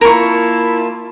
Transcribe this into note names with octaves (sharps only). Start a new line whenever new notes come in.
A#3 E4 F4 A#4 A5 C#6